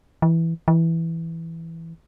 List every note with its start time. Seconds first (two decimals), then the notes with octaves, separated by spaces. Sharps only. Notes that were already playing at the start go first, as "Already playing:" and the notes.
0.22 E3
0.68 E3